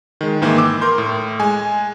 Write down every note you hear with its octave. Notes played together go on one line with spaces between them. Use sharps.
D#3 G#3
G#2 D#3 E3 A#3
D6 E6
A#4 C6 G6
A2
G#3 G#5